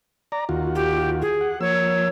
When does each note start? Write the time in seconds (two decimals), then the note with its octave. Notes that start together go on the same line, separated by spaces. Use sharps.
0.32 D5 A#5
0.49 D#2 F4 F#4
0.75 G4
1.22 G#4
1.41 F#5
1.61 F3 A#3 C#5 E6